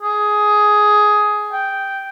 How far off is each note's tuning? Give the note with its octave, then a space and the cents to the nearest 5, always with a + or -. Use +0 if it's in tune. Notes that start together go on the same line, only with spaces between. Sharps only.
G#4 +10
G5 -5